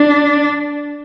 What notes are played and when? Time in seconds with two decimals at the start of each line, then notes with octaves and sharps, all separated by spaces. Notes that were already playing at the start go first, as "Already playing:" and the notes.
Already playing: D4